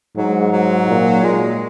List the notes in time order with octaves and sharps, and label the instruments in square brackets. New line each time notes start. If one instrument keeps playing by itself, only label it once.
[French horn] G#2 [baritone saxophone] F#3
[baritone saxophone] F#3
[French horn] A#2
[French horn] A#2 [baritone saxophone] G#3